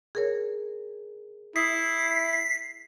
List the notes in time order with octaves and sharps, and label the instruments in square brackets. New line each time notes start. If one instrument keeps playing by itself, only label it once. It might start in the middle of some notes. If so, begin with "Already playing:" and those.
[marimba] G#4 A#4 C#5
[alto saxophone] E4 [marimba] D#6 [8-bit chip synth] B6 C7